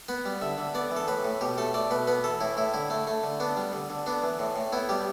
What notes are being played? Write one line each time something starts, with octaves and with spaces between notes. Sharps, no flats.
B3 B4
G3
D3 E5
D3
B3 D5
E3
A4
A2 B4
A2
B2 G4
A3 A4
A3 D5
B2 B4
B3 B4
E3 A4
A2 E4
A2 E4
D3 E4
A3
A3
D3
B3 D4
G3
D3
D3
B3 D4
E3
A2
A2
B3 E4
G3 G4